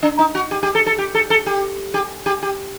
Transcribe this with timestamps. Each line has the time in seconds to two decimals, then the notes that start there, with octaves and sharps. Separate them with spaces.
0.03 D4
0.19 D#4
0.35 F#4
0.51 G4
0.63 G4
0.75 A4
0.86 A4
0.98 G4
1.15 A4
1.30 A4
1.46 G4
1.94 G4
2.26 G4
2.43 G4